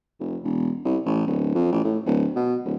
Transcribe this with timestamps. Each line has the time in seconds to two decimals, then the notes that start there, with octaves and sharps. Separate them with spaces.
0.19 F1
0.44 E1
0.85 C2
1.06 A1
1.27 D1
1.54 F2
1.72 A1
1.84 A2
2.06 D1
2.36 B2
2.65 D1